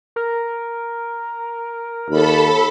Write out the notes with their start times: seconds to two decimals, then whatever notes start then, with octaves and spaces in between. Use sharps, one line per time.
0.16 A#4
2.10 D#2 A4 B5